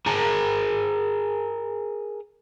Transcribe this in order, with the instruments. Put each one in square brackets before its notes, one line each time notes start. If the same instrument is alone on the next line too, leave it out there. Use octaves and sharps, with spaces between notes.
[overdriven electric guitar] G#4 A#4